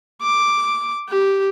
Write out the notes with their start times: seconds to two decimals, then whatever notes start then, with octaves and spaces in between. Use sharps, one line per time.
0.23 D6
1.09 G4